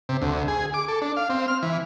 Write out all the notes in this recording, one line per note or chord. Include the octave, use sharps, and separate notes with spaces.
C3
D2
G#4
D6
A4
D4
F5
C4
F6
E3